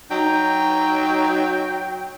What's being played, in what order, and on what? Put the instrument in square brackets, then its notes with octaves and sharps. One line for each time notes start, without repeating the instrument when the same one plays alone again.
[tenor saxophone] F#3 [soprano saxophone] D#4 [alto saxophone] G5